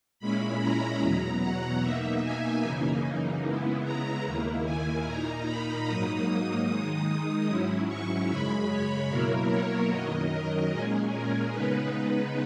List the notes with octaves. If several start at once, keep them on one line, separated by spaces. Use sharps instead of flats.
A#2 G#3 C#4 E4 B5
A#5
E2 B2 F#3 A#5
F#5
B2 A#3 D#4 E5
G#5
F#2 C#3 E3 A#3 D#4
C#3 G#3 B3 E4
A#5
D#2 D#3 A#3 E4
G#5
A#2 A#3 D#4 A#5
B5
G#2 F#3 A#3 D#4 D#6
D#3 G#3 D#4 D#6
G#2 F#3 C#4 E4
C#6
F#2 C#3 G#3 B5
C#5
B2 F#3 A#3 E4 A#4
C#5
F#2 D#3 F#3 D#5
A#4
A#2 G#3 C#4 G#4
A#4
C#3 G#3 B3 D#4 B4
B4